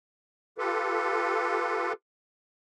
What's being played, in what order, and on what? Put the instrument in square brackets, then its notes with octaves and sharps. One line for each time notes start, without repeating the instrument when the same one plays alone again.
[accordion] F4 G4 A4 B4